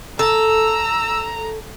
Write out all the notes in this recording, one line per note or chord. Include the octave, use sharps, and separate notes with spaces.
A4 A#5 E6